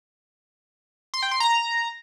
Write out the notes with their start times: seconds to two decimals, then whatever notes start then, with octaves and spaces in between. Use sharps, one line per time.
1.14 C6
1.23 G5
1.31 C6
1.40 A#5